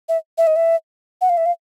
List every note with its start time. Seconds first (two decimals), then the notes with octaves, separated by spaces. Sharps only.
0.09 E5
0.38 E5
0.47 D#5
0.56 E5
1.21 F#5
1.29 F5
1.37 E5
1.46 F5